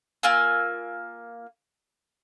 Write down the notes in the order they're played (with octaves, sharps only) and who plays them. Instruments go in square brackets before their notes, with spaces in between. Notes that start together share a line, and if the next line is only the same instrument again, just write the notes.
[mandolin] A#3 F4 G#5 E6